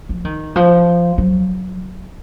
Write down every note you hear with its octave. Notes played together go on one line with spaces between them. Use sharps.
F3
D#3
F3
F#3